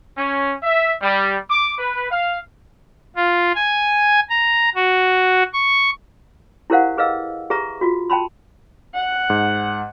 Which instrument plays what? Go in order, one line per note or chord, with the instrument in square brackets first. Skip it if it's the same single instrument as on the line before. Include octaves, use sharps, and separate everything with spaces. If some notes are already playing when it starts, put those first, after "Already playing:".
[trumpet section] C#4
E5
G3
D6
B4
F5
[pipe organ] F4
G#5
A#5
F#4
C#6
[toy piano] E4 G4 A#4 C5 F5 F#5
G#4 B4 D#5 F5 E6
G4 G#4 B4 E5 A#5 C#6
F4 F#4
G5 A5 B5 C6
[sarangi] F#5
[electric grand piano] G#2